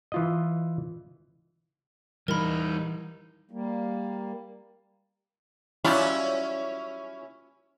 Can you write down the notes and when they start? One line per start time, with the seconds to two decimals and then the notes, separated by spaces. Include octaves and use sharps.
0.12 E3 F4 D#5
2.28 E3 G3 D#4 A#4 B5
3.51 G3 A#3
5.84 F#3 G3 C#4 E4 F4